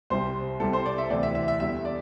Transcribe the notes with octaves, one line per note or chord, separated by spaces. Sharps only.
C2 C3 G3 C5
C2 C3 G3 A4
C5
D5
E5
D2 C3 E3 D5
E5
E5
E5
E2 D3 G3 E5
D5